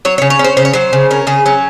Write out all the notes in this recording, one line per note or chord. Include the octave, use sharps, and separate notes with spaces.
F#3 C#5
C#5
C#3
C#5
C#4
C5
C#3 C5
C#5
F#3 C5
C#3
C#4 A#4
C#3 G#4
F#3 C#4